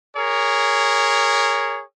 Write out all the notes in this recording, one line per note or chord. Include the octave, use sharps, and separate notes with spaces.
G#4 A#4 C#5